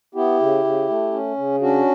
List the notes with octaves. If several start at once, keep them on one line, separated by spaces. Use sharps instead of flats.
B3 E4 G4
C#3
C#3
A3
C#4
C#3
C#4 D4 F#4